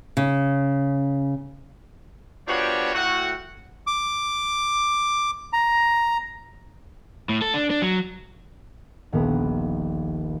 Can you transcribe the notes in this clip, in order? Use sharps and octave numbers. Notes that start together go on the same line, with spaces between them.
C#3
F3 B3 D4 F#4 G4 C#5
A2 F#4 F#5
D6
A#5
A2
A4
D4
D4
F#3
D#1 A#1 B3 A#4 D#6